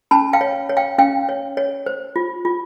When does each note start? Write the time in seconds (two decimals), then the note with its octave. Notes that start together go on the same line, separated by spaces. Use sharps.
0.11 C#4 A5 B5
0.33 F5 G5
0.41 C#5
0.69 C#5
0.77 F5 G5
0.98 C#4 F5 G5
1.29 C#5
1.57 C#5
1.86 C5
2.16 F4
2.45 F4